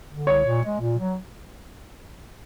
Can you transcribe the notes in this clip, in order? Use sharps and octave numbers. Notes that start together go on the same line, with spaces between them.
D3
C2 C#5
A#2
G#3
A#2
F#3